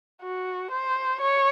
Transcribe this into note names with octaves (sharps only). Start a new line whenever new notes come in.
F#4
C5
C#5